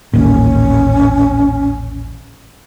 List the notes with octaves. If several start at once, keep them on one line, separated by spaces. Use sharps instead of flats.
A1 D#2 A#2 C#4